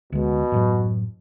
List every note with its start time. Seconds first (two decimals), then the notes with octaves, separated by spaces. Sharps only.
0.12 D2 B2 G#3
0.52 F#2 A2 F#3